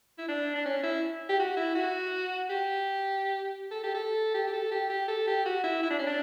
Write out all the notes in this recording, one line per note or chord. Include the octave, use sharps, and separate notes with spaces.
E4
D4
D4
C#4
E4
G4
F#4
E4
F#4
G4
A4
G4
A4
G4
G4
A4
G4
G4
A4
G4
F#4
E4
E4
D4
C#4
D4